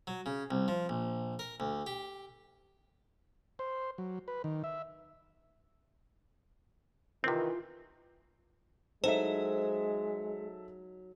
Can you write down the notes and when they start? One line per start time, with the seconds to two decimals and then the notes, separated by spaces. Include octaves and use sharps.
0.07 F#3
0.26 C#3
0.51 C2
0.68 F3
0.89 A#1
1.39 A#4
1.60 D2
1.86 G4
3.59 C5
3.98 F#3
4.28 B4
4.44 D#3
4.64 E5
7.24 C3 D#3 E3 C4 F4
9.04 F#3 G#3 D#4 A4 C5 E5